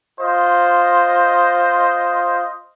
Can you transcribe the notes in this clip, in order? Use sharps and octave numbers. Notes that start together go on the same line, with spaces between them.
F4 C5 D#5